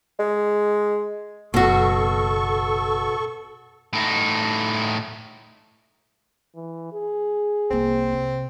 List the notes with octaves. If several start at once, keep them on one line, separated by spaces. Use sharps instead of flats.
G#3
F#1 B2 F#4 A4 C#6
A2 D#4
E3
G#4
C2 A#3 C4
C3